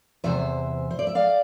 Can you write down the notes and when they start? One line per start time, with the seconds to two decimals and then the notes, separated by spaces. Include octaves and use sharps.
0.24 E2 C3 E3 C5 E5
0.91 C5
0.99 D5
1.07 E5
1.15 D5 F5